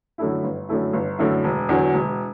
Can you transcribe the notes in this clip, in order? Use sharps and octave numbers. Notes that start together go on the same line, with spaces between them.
F#2 D3 A3 E4
G1
F#2 D3 A3 E4
G1
F#2 D3 A3 E4
E1
E2 D3 F#3
E1